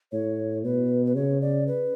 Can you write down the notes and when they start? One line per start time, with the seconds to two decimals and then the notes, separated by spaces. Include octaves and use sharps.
0.12 A2 C#5
0.64 B2 B4
1.06 B4
1.15 C#3 C#5
1.41 D5
1.67 B4